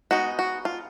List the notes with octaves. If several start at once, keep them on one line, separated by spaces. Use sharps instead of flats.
G#3 B3 D#4 F#4
F#4
F4